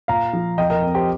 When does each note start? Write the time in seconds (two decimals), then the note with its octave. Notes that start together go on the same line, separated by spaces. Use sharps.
0.08 A#2 F5 A#5
0.33 F3
0.58 F2 D#5 G5
0.70 A#4 D#5
0.83 C4
0.95 G4 C5